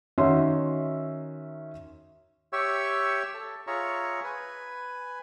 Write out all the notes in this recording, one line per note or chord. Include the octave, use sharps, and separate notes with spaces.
D#3 C#4 D#4 F#4 E5 C6
G4 C#5 E5 G5 C#6 E6
A4
F4 G#4 C#5 E5 A#5 C#6
B4 G#5